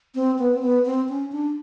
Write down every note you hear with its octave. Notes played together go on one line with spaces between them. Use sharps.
C4
B3
C4
B3
C4
C#4
D4